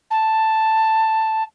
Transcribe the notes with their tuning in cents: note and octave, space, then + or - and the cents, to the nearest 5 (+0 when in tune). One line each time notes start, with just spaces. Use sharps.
A5 +5